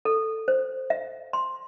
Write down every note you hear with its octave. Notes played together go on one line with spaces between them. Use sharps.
A4
C5
E5
C6